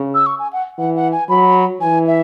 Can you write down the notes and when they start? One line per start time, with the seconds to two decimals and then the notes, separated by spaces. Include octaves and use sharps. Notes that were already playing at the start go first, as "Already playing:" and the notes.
Already playing: C#3
0.15 E6
0.26 C#6
0.39 G#5
0.53 F#5
0.78 E3 F#5
0.96 F#5
1.12 G#5
1.29 F#3 B5
1.81 E3 G#5
2.07 E5